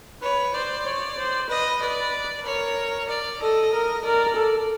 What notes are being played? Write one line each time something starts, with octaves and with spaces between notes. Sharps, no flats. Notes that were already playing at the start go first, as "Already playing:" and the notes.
B4 C#5
C5 D5
C#5
C5
B4 D#5
B4 D5
A#4 C#5
D5
A4 D#5
A#4
A#4 D5
A4